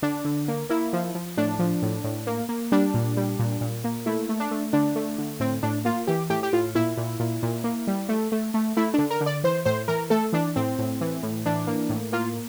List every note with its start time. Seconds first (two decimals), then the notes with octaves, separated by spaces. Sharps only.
0.02 D3 D4
0.25 D3
0.48 A#3
0.69 A#3 E4
0.93 F3
1.15 F3
1.37 A2 D4
1.59 F3
1.82 A2
2.04 A2
2.27 A#3
2.49 A#3
2.72 G3 D4
2.94 A#2
3.17 G3
3.39 A#2
3.61 A#2
3.84 A#3
4.06 A3 E4
4.29 A3
4.40 D4
4.51 A3
4.73 D3 D4
4.96 A3
5.18 D3
5.40 A2 C4
5.63 A2 D4
5.85 A#3 F4
6.07 E3 G4
6.30 A2 G4
6.43 G4
6.53 A2 F4
6.75 A#2 E4
6.97 A#2
7.20 A#2
7.43 A#2
7.64 A#3
7.87 G3
8.09 A3
8.32 A3
8.54 A3
8.77 A3 E4
8.94 D3 D4
9.10 A#4
9.21 D3
9.26 D5
9.44 E3 C5
9.65 A2 C5
9.88 E3 A#4
10.10 A3 A4
10.33 E3 D4
10.56 A2 C4
10.79 A2
11.01 E3
11.23 A2
11.46 E3 D4
11.67 A#3
11.89 A2
12.12 A#3 F4